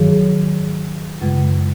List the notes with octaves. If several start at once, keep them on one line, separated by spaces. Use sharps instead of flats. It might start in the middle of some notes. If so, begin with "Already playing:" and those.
Already playing: G#2 D#3 F#3 G#4
F#2 C#3 G#3